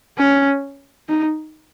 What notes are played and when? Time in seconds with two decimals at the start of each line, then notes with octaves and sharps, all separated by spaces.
0.18 C#4
1.09 D#4